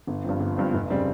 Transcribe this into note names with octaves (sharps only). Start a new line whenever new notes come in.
G1
G2 F3 C4
G1
G2 F3 C4
F1
C#3 G3 C4